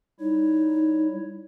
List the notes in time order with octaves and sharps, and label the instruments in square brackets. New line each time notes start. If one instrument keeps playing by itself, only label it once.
[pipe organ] G3 E4 C#5 [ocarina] D#4